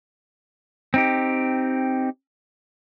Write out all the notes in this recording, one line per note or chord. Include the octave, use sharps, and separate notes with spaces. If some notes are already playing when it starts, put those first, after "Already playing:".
C4 D#4 G4